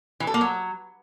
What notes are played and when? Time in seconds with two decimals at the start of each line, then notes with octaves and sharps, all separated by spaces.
0.20 E3
0.27 A4
0.34 A#3
0.41 F#3